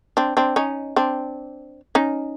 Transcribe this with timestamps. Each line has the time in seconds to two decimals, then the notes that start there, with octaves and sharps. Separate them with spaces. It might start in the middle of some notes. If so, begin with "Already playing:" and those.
0.17 C4 D4
0.37 C4 D4
0.56 C#4 D#4
0.96 C4 D4
1.95 C#4 D#4